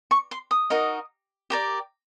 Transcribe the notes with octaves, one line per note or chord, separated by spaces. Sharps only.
C#6
C6
D#6
D#4 F#4 A#4 D#5
G4 A#4 D5